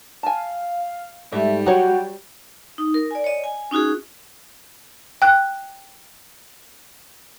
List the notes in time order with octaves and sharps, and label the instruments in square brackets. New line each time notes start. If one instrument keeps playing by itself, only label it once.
[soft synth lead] F5 [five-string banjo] G#5 A5
[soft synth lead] G#2 [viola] G3 [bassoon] A3 [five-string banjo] E5
[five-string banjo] F#3 C#5 [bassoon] F#4 [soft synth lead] G5
[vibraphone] D#4
A#4
D5 G#5
C#5 D#5
G#5
C#4 D#4 F4 F#4 G#4
[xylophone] G5 F#6